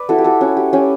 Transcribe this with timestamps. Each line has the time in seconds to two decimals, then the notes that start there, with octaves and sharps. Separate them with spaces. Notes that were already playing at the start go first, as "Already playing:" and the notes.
Already playing: B4 D5
0.09 E4 F#4 A4
0.18 G4
0.24 F#4 A4
0.41 C#4 F#4
0.57 G4
0.73 C#4 G4